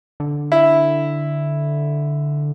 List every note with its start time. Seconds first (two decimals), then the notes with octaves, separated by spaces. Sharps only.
0.20 D3
0.52 E4